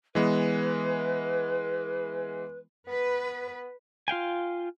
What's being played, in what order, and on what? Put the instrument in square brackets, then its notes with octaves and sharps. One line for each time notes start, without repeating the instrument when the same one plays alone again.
[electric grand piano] E3 G#3 B3 [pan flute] B4
[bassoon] B3 [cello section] B4
[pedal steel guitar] F4 F5 G5 G#5